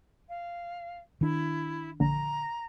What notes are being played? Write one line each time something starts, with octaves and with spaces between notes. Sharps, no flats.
F5
D#3 D4 E4
A#1 D3 A#5